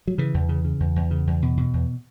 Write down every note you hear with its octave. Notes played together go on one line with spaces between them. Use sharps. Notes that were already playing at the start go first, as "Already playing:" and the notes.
F#3
C#3 E3
E2
C#3
C#3
E2
E2
C#3
E2
B2
B2
E2